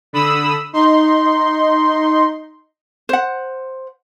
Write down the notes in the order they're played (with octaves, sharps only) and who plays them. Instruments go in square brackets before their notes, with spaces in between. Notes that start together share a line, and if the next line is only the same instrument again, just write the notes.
[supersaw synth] D3 B5 D#6 E6
D#4 C6
[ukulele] C5 F#5